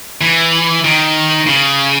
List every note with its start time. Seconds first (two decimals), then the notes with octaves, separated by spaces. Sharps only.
0.21 E3
0.84 D#3
1.47 C#3